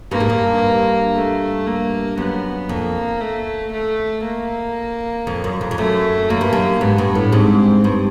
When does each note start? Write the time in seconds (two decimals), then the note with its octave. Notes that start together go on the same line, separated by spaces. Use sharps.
0.11 G2 A#3
0.20 G#2
0.30 G2
1.15 A3
1.67 A#3
2.18 F#2 B3
2.69 F2 A#3
3.21 A3
3.72 A3
4.24 A#3
5.27 F2
5.44 F#2
5.61 F2
5.71 F2
5.78 F#2 A3
6.29 F#2 A#3
6.41 G2
6.53 F#2
6.81 G#2 B3
6.98 G2
7.15 A2
7.32 G#2 C4
7.84 G2